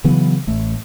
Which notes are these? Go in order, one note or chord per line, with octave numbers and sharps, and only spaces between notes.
C#3 E3 F#3 B3
A1 A3